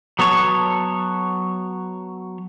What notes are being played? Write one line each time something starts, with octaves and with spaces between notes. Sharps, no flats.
F#3 B3 A4 C#5